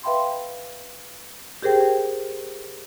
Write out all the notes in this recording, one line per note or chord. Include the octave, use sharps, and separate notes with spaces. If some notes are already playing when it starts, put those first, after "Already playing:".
B4 E5 F5 G5 B5 C6
G4 G#4 A#4 C5 G5